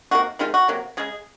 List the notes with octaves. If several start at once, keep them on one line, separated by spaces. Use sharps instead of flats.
C3 D#3 A#3 F#4
C3 D#3 G#3 F4
F#4
C3 F#3 A#3
C#3 G#3 G#4